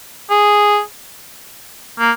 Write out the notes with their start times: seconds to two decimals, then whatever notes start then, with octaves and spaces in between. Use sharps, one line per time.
0.30 G#4
1.99 A#3